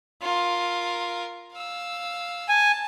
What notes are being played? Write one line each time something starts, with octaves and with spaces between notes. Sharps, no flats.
F4 A#4
F5 E6
G#5 A5